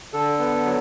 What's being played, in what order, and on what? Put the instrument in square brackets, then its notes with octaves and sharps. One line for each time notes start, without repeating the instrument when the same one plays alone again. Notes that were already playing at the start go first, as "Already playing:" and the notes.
[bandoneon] D3 A4
B3
F#3